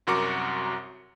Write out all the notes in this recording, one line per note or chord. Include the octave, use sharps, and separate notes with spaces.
C2 F#2 F#4 A#4 D6 C#7